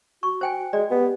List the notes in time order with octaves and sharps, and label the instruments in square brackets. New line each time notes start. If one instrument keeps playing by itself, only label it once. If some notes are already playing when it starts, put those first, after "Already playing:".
[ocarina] F#4 [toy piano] C#6
[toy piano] C5 G5 G#5
[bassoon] G#3 [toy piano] D5
[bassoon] B3 [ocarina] G4